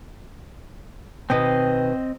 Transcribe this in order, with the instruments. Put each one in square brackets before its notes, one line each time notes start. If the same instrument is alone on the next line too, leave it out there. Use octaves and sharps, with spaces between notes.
[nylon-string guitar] B2 D#3 B4 [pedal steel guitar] C4 D#5